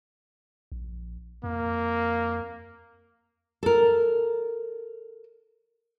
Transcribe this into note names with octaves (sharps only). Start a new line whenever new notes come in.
A#1
F2 A#3
A4 A#4